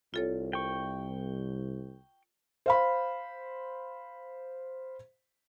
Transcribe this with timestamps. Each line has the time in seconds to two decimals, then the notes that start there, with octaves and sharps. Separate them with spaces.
0.14 C2 F4 A4 C#5
0.53 G5 C#6
2.66 C5 F5 B5